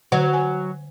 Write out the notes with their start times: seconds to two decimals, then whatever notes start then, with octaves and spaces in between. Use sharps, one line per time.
0.12 D3 F#3 F#5
0.33 G#5